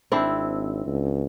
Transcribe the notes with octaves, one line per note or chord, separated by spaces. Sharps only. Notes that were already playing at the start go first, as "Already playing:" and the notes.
G#1 C4 D4 E4
C#2